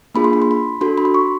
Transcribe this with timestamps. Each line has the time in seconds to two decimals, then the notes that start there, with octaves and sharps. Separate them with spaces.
0.15 A#3 D4 F4 G#4 B5
0.24 C6
0.33 B5
0.42 C6
0.51 B5
0.81 D4 F#4 A4 C6
0.98 B5
1.05 C6
1.14 C#6